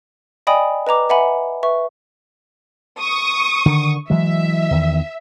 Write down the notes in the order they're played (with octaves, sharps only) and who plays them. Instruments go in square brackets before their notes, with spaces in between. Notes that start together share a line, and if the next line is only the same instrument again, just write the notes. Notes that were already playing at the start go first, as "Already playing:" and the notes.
[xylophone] D5 D#5 G5 G#5 B5 D#6
B4 D#5 A#5 D6
B4 E5 F#5 G#5 B5
B4 E5 C#6
[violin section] C#6 D#6
[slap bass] D3 D#3
[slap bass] E3 F#3 G#3 [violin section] E5
[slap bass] E2 D#3